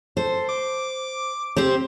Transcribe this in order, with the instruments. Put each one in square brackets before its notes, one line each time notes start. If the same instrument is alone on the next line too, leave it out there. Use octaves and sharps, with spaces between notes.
[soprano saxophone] A4 [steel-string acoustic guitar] C5
[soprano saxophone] D6
[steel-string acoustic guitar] C4 G4 C5